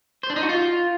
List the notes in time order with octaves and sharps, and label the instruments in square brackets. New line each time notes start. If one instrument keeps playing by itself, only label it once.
[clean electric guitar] C5
D4
D#4
F#4
F4